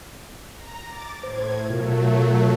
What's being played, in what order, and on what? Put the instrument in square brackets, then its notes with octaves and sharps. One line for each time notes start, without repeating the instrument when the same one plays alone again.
[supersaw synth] A#5
D6 A6
[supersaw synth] A2 G#6 [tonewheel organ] C5
[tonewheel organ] B2 F4 A#4 [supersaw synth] F#3 A3